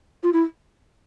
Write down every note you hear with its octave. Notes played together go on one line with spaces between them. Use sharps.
F4
E4